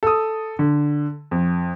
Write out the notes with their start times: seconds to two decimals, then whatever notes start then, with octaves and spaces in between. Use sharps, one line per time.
0.03 A4 D#6
0.59 D3
1.31 F2